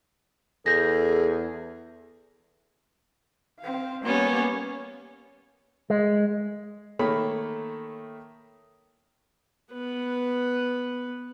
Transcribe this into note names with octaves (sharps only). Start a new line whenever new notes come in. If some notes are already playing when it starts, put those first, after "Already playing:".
E2 G#4 A4 G6 A#6
C4 F5
G3 A#3 B3 C#4 C#5
G#3
D#3 A3 A#3 C#5 B5
B3 B4